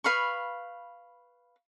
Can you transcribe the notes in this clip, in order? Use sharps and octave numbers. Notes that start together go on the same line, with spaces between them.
B4 F5 B5 C#6